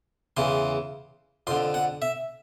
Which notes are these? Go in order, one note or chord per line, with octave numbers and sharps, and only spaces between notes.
E2 C#3 E3 C6
F2 D3 C6
F#5
E5